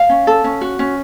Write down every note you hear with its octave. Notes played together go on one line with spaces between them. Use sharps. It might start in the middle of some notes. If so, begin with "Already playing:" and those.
Already playing: F5
C#4
A4
C#4
F#4
C#4